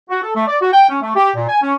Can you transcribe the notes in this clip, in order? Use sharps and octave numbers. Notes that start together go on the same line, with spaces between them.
F#4
A4
A3
D5
F#4
G5
C#4
A3
G4
A#2
G#5
C#4